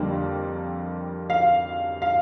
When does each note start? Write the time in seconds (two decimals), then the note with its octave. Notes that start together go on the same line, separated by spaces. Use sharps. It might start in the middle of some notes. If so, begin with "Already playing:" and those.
Already playing: F2 D3 G3 A#3
1.30 F5
2.02 F5